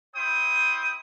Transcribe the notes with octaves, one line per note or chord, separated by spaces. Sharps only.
E4 C5 G5 D#6